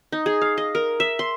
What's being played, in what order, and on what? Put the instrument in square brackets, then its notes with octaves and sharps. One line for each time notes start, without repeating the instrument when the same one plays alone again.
[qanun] D#4
G#4
F5
D#5
A#4
E5
C6